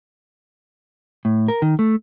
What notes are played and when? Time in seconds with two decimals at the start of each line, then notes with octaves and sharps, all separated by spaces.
1.25 A2
1.48 A#4
1.62 D#3
1.79 A3